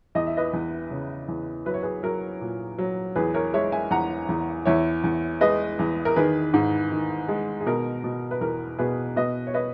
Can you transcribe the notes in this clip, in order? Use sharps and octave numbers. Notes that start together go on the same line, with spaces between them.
E2 D#5
E5
B4 D#5
E2
C#3
E2
F#3 B4
C#5
G#4 B4
F#3 A#4
A#2
F#3
E2 G#4 B4
A#4 C#5
G#3 C#5 E5
E5 G#5
E2 F#5 A#5
E2
E2 C#5 E5
E2
G#3 B4 D#5
E2
A#4
D#3 G#4 B4
G#2
D#3
G#3
G#4
B2 A#4
B2
B4
E2 A#4
B2 G#4 B4
B2 B4 D#5
C#5
B4 D#5